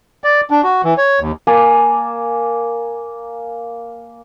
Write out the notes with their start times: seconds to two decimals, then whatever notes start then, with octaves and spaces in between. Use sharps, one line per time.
0.24 D5
0.51 D4
0.63 F#4
0.84 E3
0.98 C#5
1.20 D#2
1.47 A#3 G#5 A5 D6